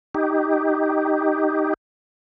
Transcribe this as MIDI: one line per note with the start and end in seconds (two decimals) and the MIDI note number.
0.15 1.74 63
0.15 1.74 67